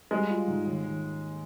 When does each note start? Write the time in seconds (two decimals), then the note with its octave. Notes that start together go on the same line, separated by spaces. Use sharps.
0.11 G3 G#3
0.29 F4
0.48 G#2
0.66 D#2
0.84 D#2